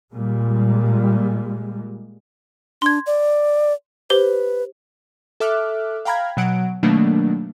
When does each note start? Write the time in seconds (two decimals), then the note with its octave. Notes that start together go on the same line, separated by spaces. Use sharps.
0.13 A#2 G3 G#3
2.82 D4 C6 G#6
3.06 D5
4.10 G4 B4 C5 G7
5.40 A4 E5 D6 F6 F#6
6.05 F5 G5 A#5 B5 F6 G#6
6.37 B2 F#3 F#5 D7
6.83 B2 D#3 F#3 A3 A#3 D4